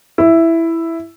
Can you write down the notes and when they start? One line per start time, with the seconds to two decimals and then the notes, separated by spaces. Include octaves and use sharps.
0.18 E4